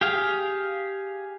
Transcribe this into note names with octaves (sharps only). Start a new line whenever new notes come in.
G4 G#4 F5